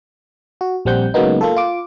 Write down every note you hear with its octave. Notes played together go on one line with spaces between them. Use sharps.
F#4
A#1 G3 C4 F#5 G6
C#3 F#3 G#3 A#3 B3 D#4
A#3 F4 A4
F4 D6